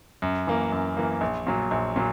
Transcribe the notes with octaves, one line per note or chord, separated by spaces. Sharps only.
F#2
E3 A#3
F#2
E3 A#3
A#1
A#2 F#3
A#1
A#2 F#3